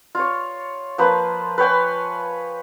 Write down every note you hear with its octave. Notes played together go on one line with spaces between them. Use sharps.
F4 C#5
F3 A#3 B4 C5
B4 C#5 G5 G#5